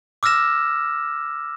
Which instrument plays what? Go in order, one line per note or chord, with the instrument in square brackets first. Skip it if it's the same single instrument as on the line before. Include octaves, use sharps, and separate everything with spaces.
[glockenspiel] D6 E6 F6 A#6 E7